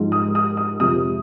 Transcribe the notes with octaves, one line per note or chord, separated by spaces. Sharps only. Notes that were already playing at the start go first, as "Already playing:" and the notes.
Already playing: G#2 F3 G#3
D#6
D#6
D#6
F2 C3 F3 G#3 D#6